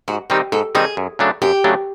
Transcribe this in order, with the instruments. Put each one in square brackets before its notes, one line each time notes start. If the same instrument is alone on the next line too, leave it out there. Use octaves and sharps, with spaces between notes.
[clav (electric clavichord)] G#2 [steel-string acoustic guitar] F#4
[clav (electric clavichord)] D#3 G3 C4 D#4 [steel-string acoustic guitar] G4
[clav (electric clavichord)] G#2 [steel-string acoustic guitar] A4
[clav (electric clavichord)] D#3 G3 C4 D#4 [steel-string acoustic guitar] G#4
[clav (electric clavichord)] F#2
C#3 F#3 A3 D4
[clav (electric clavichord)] F#2 [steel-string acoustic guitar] G4
[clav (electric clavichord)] C#3 F#3 A3 D4